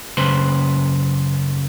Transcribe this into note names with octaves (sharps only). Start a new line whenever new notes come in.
F#2 C#3 B4 C5